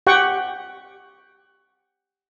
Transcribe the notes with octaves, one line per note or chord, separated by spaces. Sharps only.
G4 F#5 G5 C#6